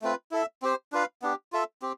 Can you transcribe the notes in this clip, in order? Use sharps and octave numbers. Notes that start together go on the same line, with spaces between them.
A3 C4 F4 B4
E4 A4 E5
C4 G4 C5
D4 F4 B4 F5
B3 D4 G4
F4 A4 E5
C4 G4